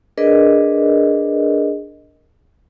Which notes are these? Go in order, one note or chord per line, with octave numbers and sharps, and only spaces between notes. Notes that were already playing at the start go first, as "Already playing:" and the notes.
D4 G#4 A#4 B4 D5 D#5